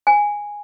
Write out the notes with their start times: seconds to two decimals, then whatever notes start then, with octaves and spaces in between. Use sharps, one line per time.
0.07 G#5